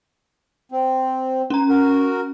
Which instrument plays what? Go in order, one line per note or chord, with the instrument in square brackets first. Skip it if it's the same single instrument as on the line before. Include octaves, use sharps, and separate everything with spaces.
[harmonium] C4
[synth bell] C#4 A#5
[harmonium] F#4 A#4